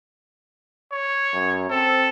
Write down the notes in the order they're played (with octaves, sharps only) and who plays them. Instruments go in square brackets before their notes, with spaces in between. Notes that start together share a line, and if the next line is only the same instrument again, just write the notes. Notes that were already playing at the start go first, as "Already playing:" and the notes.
[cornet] C#5
[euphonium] F#2
[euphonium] C4 [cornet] A4